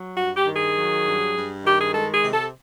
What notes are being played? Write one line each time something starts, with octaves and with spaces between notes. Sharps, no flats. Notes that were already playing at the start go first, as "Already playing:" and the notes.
Already playing: F#3
G2 F#4
G4
D#3
G#4
F#3
G2
G2
D#3 G4
G#4
G#3 A4
G#4
C3
A4